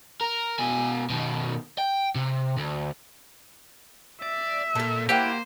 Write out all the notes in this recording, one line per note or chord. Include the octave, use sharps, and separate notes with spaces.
A#4
B2 G#5
B2 D#3
G5
C3
D2
D5 E5
A#2 A4 A#4
A#3 E4 G4 C5 F#5 G5